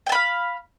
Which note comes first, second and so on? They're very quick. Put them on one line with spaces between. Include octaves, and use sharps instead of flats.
G5 A5 B5 F5